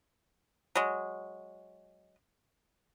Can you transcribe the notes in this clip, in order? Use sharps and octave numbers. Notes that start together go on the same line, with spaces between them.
F#3 G#3